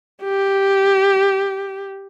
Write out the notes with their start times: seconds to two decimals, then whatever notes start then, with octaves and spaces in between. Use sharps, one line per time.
0.23 G4